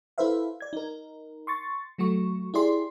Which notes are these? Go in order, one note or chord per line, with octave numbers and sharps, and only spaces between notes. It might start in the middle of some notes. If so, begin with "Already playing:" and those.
E4 A4 B4 C5 E5 F5
D5 G#6
D#4 A#4
C6 C#6 A6
F#3 A3 F#4 C#6
E4 G4 G#4 D5 C6